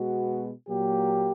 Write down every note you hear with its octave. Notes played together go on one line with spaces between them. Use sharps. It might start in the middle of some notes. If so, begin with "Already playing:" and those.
Already playing: B2 G#3 B3 F#4
A#2 F#3 A#3 G4